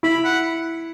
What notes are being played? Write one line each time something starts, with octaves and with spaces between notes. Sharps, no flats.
E4 B5
F#5